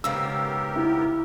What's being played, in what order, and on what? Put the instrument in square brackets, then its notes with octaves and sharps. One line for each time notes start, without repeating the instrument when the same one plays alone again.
[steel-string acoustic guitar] G#2 C#3 [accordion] B3 G4 A#4 [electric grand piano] E6
[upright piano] E4